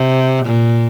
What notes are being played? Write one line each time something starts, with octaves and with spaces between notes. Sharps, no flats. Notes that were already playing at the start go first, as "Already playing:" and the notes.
Already playing: C3
A#2